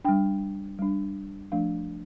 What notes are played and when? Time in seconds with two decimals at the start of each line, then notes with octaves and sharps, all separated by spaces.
0.05 G3 D4 G5
0.79 G3 D4
1.52 F3 A3 D4 F5